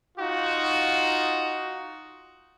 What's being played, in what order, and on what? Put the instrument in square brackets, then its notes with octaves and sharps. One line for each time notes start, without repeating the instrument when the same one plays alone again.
[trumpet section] D#4 F4 F#4